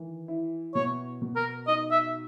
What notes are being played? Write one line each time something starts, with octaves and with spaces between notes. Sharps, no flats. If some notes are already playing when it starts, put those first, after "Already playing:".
Already playing: D#3 E3
E4
B2 C#5
B2
A#4
D#4 D#5
E5